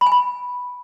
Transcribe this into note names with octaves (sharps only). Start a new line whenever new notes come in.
B5
G#5
B5